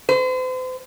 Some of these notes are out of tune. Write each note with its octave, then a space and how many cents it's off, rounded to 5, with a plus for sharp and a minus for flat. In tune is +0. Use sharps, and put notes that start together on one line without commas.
C5 -40